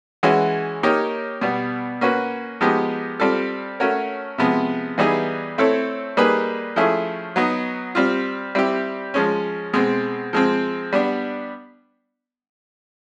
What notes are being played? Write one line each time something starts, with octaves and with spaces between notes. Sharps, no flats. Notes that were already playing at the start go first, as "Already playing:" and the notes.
E3 G#3 C#4 F#4
A#3 D#4 G4 A#4 C#5
B2 G3 B3
A#3 C#4 F#4 B4
F3 G#3 B3 D#4 G4
G3 C4 F4 A4
A3 C#4 F#4 A#4 C#5
C3 F3 G#3 B3
E3 G3 B3 D#4 G#4
A3 C4 E4 A4 C#5
G3 A#3 D#4 G#4 B4
F3 A3 C#4 E4 G#4
F#3 B3 D#4
G3 C4 F4
G3 C4 E4 G4
F3 G#3 C#4
B2 G#3 C4
F3 G#3 C4
G3 B3 D4